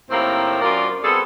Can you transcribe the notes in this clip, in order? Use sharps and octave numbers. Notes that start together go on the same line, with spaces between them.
A2 D#3 A#3 C4 E4 G4
F#2 F#3 F4 A#4 D5
G3 B3 C4 G#4 A4